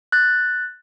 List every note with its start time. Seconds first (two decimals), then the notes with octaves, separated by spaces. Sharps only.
0.12 F#6 A6